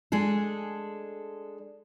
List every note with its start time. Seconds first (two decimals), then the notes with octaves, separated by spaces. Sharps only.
0.12 G#3 D4 G#4 A4